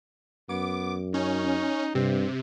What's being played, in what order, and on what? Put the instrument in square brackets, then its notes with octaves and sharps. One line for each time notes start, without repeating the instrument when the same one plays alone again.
[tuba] F#2 [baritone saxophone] B3 [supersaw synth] D6
[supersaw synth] C#4 [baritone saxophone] D#4
[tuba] G2 [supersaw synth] C3 [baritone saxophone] C4